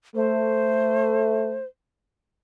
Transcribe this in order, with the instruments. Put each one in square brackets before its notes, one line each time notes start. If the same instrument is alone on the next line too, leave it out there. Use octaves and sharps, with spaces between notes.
[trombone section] A3 [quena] C5